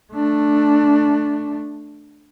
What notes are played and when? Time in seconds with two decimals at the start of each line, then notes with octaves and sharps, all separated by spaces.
0.13 A3 D4